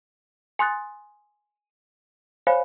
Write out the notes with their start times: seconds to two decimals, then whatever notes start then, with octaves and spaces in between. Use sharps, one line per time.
0.59 G#5 C6 D#6 F#6 A6
2.47 C5 C#5 F5 G#5 B5